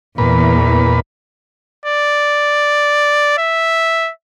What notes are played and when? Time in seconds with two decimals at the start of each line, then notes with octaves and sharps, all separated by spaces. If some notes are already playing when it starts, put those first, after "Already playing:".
0.18 E2 A#2 B4
1.86 D5
3.38 E5